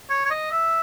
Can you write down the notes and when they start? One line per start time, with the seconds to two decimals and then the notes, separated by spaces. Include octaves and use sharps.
0.10 C#5
0.25 C#5
0.30 D#5
0.51 E5